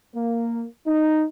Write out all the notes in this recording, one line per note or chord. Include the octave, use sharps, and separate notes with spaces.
A#3
D#4